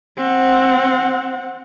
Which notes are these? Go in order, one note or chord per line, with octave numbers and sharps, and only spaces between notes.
C4 F#5